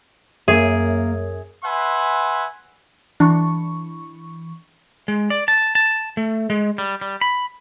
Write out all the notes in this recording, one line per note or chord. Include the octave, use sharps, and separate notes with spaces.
F#2 A#3 G#4 E5
B4 E5 F#5 G#5 C6
E3 D4 C#6
G#3
D5
A5
A5
A3
G#3
G3
G3
B5